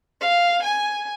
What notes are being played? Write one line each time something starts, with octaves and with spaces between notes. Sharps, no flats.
F5
G#5